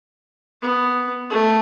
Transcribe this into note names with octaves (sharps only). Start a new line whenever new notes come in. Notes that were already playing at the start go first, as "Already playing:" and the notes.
B3
A3